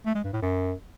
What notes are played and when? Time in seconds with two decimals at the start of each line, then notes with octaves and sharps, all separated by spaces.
0.06 A3
0.15 G#3
0.24 G2
0.33 A2
0.42 F#2